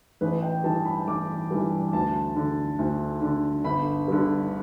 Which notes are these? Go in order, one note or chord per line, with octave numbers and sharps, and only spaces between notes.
A1 B4
G5
G2 E3 A5
B5
A1 D6
G2 E3
D2 A5
D3
D2
D3
G1 B5
G2 D3